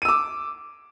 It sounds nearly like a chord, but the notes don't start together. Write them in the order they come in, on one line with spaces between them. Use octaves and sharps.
D#7 E6 D6